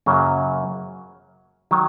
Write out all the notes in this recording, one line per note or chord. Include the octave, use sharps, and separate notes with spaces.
F#2 C#3 F#3 A#3
D#3 F#3